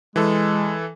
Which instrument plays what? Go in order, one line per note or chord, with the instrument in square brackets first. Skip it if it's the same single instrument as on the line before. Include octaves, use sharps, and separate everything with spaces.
[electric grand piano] E3 A4 [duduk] G#3